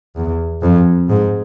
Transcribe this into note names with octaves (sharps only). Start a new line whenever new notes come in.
E2
F2
G#2